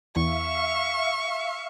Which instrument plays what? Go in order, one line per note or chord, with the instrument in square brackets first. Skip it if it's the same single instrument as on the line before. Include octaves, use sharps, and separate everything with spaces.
[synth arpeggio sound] E2 [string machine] E5 F5 [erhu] C#6